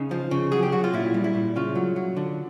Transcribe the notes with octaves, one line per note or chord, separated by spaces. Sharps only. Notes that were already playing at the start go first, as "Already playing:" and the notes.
Already playing: C#3 D#4
F3
C#3
F#3 G#4
G4
F#3 F#4
F4
A#2 E4
G3
E4
A#2
C#3 F4
F#3
F#3
D3